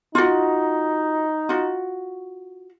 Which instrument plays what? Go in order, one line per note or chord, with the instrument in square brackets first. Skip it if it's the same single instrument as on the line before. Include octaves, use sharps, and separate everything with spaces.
[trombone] D#4 [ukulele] F4 F#4
[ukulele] F4 F#4